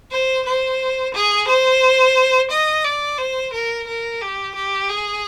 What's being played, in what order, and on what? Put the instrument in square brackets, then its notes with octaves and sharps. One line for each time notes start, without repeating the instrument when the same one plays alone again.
[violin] C5
C5
G#4
C5
D#5
D5
C5
A#4
A#4
G4
G4
G#4